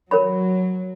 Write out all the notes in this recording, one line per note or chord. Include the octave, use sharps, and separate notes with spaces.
F#3 A#4 C#5 B5